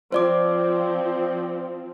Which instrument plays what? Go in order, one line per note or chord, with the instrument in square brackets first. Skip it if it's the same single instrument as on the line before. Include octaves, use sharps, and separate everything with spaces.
[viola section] F3 C4 [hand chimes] C5 D5 D6